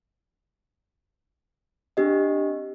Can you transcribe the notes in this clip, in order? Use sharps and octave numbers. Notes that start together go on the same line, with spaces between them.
C4 D4 G4 D#5